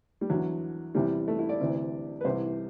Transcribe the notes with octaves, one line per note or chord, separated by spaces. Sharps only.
G3
E2 D3 F#3
E2 C3 E3 G3
A3
E4
D5
D2 C3 E3
B4
C2 C3 E3 C5